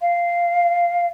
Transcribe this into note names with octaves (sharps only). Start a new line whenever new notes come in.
F5